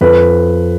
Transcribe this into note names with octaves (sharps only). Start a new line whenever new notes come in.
F2 B4